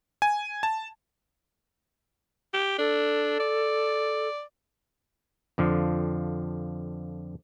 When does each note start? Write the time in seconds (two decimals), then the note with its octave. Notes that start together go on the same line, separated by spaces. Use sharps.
0.22 G#5
0.63 A5
2.54 G4
2.79 D4 A4
3.40 D5
5.58 F2 D3 F3